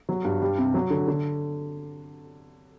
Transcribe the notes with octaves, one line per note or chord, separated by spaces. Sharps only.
F#3
G2
G3
C3
F#3
D3
D3